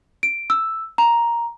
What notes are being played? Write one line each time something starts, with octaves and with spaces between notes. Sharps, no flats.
D7
E6
A#5